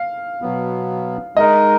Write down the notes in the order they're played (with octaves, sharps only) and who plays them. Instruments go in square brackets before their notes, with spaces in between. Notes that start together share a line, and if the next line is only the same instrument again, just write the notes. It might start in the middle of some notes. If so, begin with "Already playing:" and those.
Already playing: [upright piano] F5
[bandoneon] B2 F#3 B3
[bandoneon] G#3 D#4 A#4 [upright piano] D#5